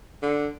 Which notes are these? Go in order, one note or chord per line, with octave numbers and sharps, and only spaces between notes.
D3